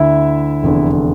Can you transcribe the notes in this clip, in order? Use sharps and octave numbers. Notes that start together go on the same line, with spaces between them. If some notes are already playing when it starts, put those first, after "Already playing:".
Already playing: D2 D3 E4 E5
F1 E2 D3